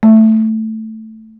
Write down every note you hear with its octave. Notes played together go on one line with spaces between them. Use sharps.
A3